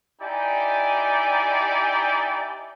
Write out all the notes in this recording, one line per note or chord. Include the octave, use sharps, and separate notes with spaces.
D#4 E4 G4 D5 G5 G#5